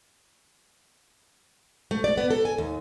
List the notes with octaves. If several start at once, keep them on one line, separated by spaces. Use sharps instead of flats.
A3
D5
B3
A4
G#5
D#2